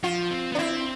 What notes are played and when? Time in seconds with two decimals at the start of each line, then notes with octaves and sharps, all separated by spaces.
0.04 F3 F4
0.31 C4
0.52 B3
0.55 D4
0.59 C4 E4